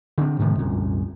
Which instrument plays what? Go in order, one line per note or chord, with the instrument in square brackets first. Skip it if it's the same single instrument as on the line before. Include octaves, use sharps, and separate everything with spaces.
[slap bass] D3 C4
G#2 C3 D#3 F3
C2 F#2 A#2